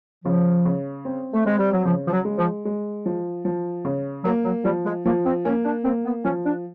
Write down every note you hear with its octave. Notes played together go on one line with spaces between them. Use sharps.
C#3 F3
C#3
C4
A3
G#3 C4
G3
F#3
C#3 F3
F3
F#3
G#3
F3
G#3
F3
F3
C#3
F#3 A#3
F#3
F3 G3
G#3
F3 A#3
C4
A#3 C#4
D4
A#3 C4
B3
F3 C#4
D4